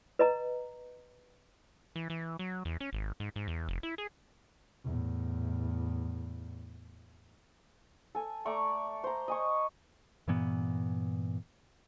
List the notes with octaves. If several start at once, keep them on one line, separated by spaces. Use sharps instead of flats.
B4 D#5 A#5
E3
E3
F#3
E2
C#4
G#1
G#2
G#2
E2
F1
E4
G#4
E2 A2
A4 G#5
A3 D5 A#5 C#6
C5 A#5
D#5 G#5 C#6
G2 A#2 E3 B3